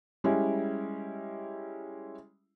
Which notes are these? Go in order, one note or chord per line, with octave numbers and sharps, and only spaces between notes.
G3 G#3 C#4 E4